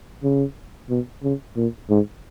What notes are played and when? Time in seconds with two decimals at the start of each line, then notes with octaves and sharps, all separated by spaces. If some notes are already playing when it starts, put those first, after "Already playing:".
0.24 C#3
0.90 B2
1.23 C#3
1.57 A#2
1.90 G#2